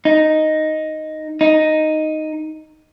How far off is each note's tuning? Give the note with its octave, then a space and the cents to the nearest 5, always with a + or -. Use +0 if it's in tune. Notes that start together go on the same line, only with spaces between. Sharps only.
D#4 +0
D#4 +0